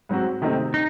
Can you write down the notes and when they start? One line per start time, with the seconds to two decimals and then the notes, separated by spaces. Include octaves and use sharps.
0.09 G#2 F#3 C4 F#4
0.42 C3 D#3 A3 C4 D#4
0.74 D#4